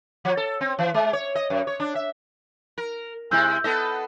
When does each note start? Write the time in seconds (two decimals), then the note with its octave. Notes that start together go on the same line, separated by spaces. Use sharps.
0.25 F3
0.37 A4
0.61 C4
0.79 E3
0.94 G#3
1.13 C#5
1.35 D#5
1.50 F#2
1.67 C#5
1.80 D4
1.95 E5
2.78 A#4
3.31 C3 G#3 E4 E6 G6
3.64 B3 A4 D#5